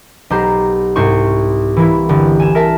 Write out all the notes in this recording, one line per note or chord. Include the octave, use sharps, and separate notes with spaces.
B1 G4 C5 A#5
C2 G#2 C5 C#6
E3 A#3 E4
G1
G#5 E7
A#4 E5 A5